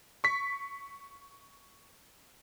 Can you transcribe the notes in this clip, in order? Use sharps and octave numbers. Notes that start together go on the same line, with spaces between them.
C#6 B6